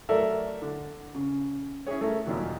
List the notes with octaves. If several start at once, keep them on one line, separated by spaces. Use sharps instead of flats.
F#3 A3 A4 A#4 D5 E5
D3
C#3
C#4 E4 G#4 C#5
A3 A#4
D#2 A#2 D#3 F#3